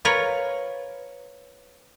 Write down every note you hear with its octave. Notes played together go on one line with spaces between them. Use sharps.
F4 A#4 B4 C#5